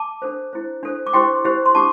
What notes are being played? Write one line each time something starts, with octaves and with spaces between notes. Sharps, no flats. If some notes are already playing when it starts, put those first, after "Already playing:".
Already playing: A5 D6
D4 A4 C5
E4 C5
D4 A4 C5
D6
E4 G4 C5 G5 C6
E4 G4 C5
C6
D4 G4 A5 D6